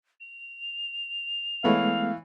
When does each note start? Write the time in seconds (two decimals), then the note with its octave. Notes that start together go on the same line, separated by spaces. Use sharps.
0.21 F7
1.64 E3 G#3 A3 B3 C#5 F5 B5